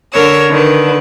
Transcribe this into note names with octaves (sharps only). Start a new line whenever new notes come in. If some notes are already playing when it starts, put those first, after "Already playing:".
D3 A#4 C#5 E6
D3 D#3 B4